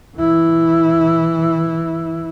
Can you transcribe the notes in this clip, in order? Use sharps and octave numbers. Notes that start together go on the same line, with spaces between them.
E3 E4